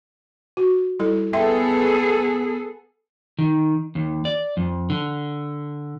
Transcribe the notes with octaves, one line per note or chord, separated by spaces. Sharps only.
F#4
G3 E4 A4
B3 G#4 A4 E5 G5 C6
D#3
D#2
D5
F2
D3